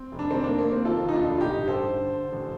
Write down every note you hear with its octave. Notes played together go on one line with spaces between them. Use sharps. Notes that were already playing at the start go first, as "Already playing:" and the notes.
Already playing: C4
F1
D4
D#3 C4
D#3 A#3 D4
A#3
F1
C4
D#3 F4 A4
D#2 D#4
D4 F4
F1
F4
A1 D#4 G4
G2
A4 C5
G2
D3
D3
A1